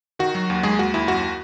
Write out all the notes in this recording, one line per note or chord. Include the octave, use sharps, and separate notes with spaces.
D#3 F#4
F#3
D#2
D#2 G#3 G#4
D#2 F#4
D#2 E4
F#2 F#4